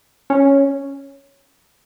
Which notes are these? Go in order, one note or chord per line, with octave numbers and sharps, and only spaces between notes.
C#4